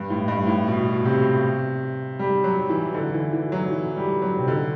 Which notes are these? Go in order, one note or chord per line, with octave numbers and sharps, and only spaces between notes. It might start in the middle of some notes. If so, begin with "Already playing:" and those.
Already playing: G2
A2
G2
A2
B2
C3
G3
F#3
E3
D3
E3
E3
F#3
E3
G3
F#3
C3
D3